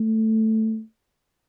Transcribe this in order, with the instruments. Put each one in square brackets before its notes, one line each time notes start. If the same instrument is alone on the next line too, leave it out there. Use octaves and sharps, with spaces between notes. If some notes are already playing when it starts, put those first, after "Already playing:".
Already playing: [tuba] A3